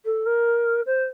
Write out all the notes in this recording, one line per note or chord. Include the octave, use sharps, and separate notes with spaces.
A4
A#4
C5